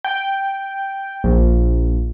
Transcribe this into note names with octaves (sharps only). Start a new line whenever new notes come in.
G5
A#1